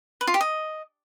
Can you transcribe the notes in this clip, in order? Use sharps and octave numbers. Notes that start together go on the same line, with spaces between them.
B4
F4
G4
D#5